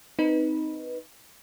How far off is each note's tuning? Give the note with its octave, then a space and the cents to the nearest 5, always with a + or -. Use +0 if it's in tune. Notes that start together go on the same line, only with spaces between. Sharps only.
C4 -15 D#4 +0 B4 -10